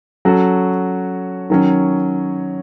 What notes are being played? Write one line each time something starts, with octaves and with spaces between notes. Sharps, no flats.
F#3 C#4 F#4 A4
D#3 F#3 C#4